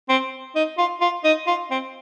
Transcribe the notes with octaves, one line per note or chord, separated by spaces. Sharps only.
C4
D#4
F4
F4
D#4
F4
C4